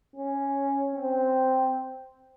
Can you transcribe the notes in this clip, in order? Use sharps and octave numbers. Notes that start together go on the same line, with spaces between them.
C#4
C4